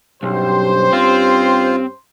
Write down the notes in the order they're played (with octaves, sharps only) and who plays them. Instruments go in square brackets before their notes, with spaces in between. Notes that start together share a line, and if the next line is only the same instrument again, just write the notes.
[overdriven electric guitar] B1 [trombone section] G2 C#4 G4 [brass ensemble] C5
[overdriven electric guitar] C4 [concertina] F4